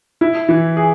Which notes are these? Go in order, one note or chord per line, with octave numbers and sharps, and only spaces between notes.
E4
E3
G#4